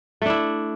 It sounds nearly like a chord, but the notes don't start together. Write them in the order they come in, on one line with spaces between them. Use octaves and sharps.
A3 D4 E4